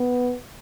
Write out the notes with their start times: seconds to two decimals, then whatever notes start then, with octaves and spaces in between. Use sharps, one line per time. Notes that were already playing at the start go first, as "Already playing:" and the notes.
Already playing: B3